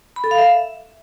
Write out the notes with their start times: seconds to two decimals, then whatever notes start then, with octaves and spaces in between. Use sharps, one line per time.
0.16 B5
0.24 A4
0.31 F5
0.38 E5